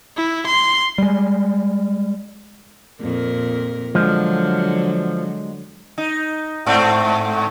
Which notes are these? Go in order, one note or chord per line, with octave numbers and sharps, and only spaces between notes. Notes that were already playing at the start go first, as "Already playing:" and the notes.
E4
C6
G3 G#3
F2 A#2 A#4
D3 F3 F#3 G#3
D#4
G#2 A3 C4